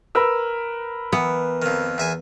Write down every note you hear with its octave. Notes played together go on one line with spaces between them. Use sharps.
A#4 B4 E6
E3 B3
F2 D#3
E2 E5 G#5